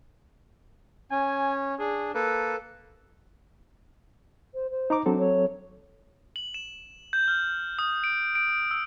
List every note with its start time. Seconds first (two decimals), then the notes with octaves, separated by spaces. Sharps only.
1.11 C#4 G#5
1.79 D4 G#4
2.14 A#3 A4 B4
4.54 C5
4.71 C5
4.90 D#4 A#5 D6
5.06 F#3 C4 D4 A4
5.19 C#5
6.36 F#7
6.54 E7
7.13 G6
7.28 F6
7.79 D#6
8.04 D7
8.35 D7
8.71 E6